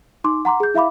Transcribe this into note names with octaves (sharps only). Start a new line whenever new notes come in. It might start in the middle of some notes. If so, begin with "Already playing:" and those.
D#4 C6 D6
F#5 A#5 C6 D6
G#4 G6
E4 E5 F5 B5 D6